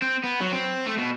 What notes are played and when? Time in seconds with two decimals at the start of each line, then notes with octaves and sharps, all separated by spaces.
0.02 C4
0.24 B3
0.41 F#3
0.52 C4
0.86 A3
0.97 B2